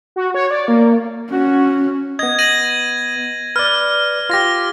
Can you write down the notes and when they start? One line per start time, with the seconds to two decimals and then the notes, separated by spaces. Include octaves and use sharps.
0.16 F#4
0.34 C#5
0.51 D5
0.68 A#3
1.31 C#4 F#4
2.19 B3 D#5 G#6
2.39 A#6 D#7 F#7
3.56 B4 D5 F6
4.30 F4 G4 F6 A#6